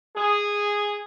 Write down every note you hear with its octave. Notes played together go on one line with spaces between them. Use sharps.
G#4